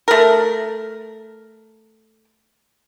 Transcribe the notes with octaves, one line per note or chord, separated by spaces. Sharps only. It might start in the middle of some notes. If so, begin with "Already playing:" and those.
A3 A#4